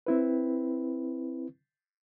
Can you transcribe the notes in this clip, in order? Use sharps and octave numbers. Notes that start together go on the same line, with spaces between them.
C4 E4 B4